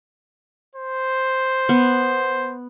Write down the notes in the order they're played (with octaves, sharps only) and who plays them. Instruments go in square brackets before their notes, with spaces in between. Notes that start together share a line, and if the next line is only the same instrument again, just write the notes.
[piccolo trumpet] C5
[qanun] B3